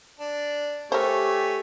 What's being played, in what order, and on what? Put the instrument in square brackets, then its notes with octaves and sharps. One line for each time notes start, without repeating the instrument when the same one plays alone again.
[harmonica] D4
[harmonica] A3 C#5 G#5 [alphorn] G4 [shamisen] A#4 C5